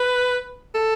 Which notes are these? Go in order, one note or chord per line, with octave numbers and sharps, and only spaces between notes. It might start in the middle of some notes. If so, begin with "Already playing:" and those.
Already playing: B4
A4